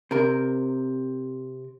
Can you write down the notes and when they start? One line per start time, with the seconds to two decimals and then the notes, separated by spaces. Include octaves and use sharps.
0.11 C3 A#4